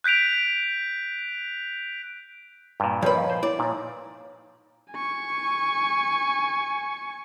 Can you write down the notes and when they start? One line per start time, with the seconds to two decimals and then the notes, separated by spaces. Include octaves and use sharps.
0.04 F#6 G6 B6 D7 F7
2.80 G2 A#2 A5
3.02 F3 A#4 B4 C#5 D5
3.15 D#5 F5
3.30 C5
3.43 E4 C#5 D5
3.59 A#2 D#4
4.91 G#5 C#6